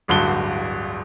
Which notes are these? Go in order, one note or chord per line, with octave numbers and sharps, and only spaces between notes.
D1 A1 G2 D3 F#4 G7